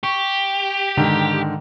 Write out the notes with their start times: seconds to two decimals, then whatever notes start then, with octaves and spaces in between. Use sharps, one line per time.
0.03 G4 C#6
0.97 G#2 D3 D#3